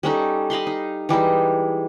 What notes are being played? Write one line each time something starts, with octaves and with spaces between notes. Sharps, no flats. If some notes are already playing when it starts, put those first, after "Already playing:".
G3 C#4 D#4 A4
D#5 F5 B5 C6
D#4
E3 G3 G#3 D#4